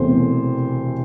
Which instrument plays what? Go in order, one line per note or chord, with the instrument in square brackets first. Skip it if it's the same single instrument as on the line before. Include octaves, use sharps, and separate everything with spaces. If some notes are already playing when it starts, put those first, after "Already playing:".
Already playing: [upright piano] E1 E2 C3 A3 C4 C5